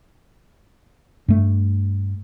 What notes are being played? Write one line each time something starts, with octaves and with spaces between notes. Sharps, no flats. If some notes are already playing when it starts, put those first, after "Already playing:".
G2 A3